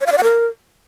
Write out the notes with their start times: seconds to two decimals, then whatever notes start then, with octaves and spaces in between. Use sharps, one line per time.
0.01 C#5
0.06 F5
0.12 D5
0.18 F#5
0.23 A#4